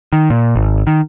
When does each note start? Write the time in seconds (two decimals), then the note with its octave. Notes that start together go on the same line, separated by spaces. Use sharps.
0.13 D#3
0.30 A#2
0.56 G#1
0.87 D#3